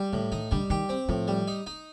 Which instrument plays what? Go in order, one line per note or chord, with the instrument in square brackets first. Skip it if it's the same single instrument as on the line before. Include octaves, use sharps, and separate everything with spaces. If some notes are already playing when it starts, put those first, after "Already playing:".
Already playing: [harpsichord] G3
[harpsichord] A2 [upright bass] D3
[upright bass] D#3 [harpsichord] D#4
[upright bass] D3 [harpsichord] G3
[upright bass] D#3 [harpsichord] G4
[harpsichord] C4
[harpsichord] A2 [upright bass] F3
[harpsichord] G3
D#4
D#4